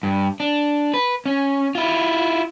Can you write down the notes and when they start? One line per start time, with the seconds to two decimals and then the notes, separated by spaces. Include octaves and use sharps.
0.03 G2
0.40 D4
0.94 B4
1.26 C#4
1.75 E4 F4